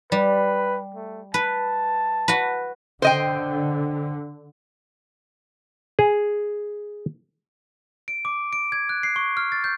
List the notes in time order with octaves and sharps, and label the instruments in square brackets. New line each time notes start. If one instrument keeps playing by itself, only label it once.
[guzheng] G3 [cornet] B4
[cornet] A3
[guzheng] B4 [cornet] A5
[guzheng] F#4 B4
[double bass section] D3 [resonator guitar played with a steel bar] C5 D#5 G5
[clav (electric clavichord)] G#4
[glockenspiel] D7
D6
D7
G#6
F#6
C7
C#6
F6
A6
G6